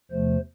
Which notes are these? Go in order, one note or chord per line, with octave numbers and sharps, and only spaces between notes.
E2 C3 F3 A3 C5